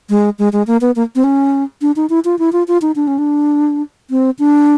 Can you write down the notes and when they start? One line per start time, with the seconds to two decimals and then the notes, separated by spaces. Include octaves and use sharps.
0.10 G#3
0.39 G#3
0.53 G#3
0.67 A#3
0.81 B3
0.96 A#3
1.15 C4
1.24 C#4
1.82 D4
1.96 D#4
2.10 E4
2.25 F4
2.39 E4
2.53 F4
2.68 F4
2.82 D#4
2.96 D4
3.07 C#4
3.18 D4
4.10 C4
4.39 D4